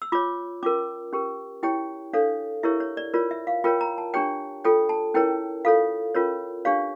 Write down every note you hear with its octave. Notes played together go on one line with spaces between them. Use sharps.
E6
F4 C#5 D6
C#4 F4 A#4 D6
C#4 G4 A#4
E4 G4 C#5 G5
D4 A4 C#5 F5
E4 G4 A#4 C#5 E5
C#5
D5
F4 A#4 C#5 D5
E5
F5
F4 A#4 C#5 G5
A#5
A5
D4 G4 C#5 G5
F4 A4 C#5 G5
A5
C#4 E4 A#4 C#5 G5
F4 A4 C#5 F5
C#4 F4 A#4 C#5
D4 G4 C#5 F5